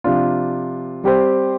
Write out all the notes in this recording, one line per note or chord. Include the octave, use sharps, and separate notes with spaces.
C3 F3 D4 F4
G3 C4 G4 C5